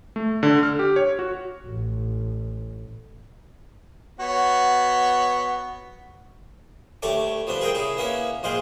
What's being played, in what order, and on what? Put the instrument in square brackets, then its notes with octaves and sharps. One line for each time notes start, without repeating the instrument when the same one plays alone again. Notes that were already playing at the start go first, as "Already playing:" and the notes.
[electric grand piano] A3
D3
F6
G4
C#5
F#4
[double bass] A1
[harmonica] B3 F#4 C#5
[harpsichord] D2 G3 A3 C#5 A5 D6
F3 G3 B3 D4
G#4 A#4 D#5 G5
C#3 E4 G#4
A#3 B3 C#4 E4 C#5
A#1 G#2 G#4 C5 F5 G5